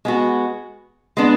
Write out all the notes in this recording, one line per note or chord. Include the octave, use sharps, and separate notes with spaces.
G#3 B3 F#4
G#3 B3 D4